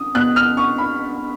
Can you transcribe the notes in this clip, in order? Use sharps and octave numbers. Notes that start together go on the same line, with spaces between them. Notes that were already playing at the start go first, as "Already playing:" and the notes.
Already playing: D#6
B2 F#6
F6
C#6
B5